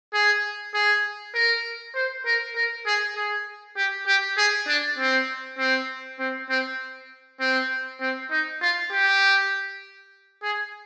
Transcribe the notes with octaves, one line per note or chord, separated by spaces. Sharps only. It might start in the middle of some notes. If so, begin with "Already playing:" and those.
G#4
G#4
A#4
C5
A#4
A#4
G#4
G#4
G4
G4
G#4
D4
C4
C4
C4
C4
C4
C4
D#4
F4
G4
G#4